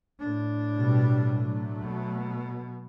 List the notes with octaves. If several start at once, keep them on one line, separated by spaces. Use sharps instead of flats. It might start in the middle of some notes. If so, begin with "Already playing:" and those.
A2 D4
B2 G3
F#3 A3
B2